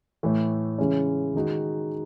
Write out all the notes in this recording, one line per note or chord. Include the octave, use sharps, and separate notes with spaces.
A2 E3 A3
C#3 E3 G#3 C#4
D#3 G#3 D#4 F#4